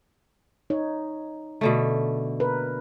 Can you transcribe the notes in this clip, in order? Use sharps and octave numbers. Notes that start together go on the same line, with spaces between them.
D#4 C#5
B2 D3 A3
A#4 B4